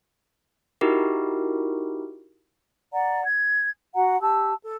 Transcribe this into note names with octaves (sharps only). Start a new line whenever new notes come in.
D#4 E4 F#4 G4 A#4
D5 F#5 A#5
G#6
F#4 F#5 A#5
G4 A5 E6
A4